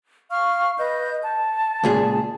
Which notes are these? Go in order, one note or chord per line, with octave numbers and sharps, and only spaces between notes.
F5 C#6 F6
B4 D#5 G6
A5
C#2 A#2 G#4